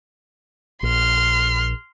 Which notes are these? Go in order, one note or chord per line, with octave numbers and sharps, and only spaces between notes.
A#1 C6 F6